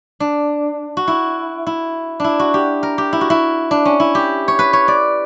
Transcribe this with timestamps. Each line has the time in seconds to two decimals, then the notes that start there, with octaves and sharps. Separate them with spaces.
0.20 D4
0.97 F#4
1.08 E4
1.66 E4
2.20 D4 E4
2.39 F#4
2.54 G4
2.83 A#4
2.98 G4
3.13 E4
3.21 F#4
3.30 E4
3.71 D4
3.85 C#4
4.00 E4
4.15 G4
4.48 C#5
4.59 B4
4.73 C#5
4.88 D5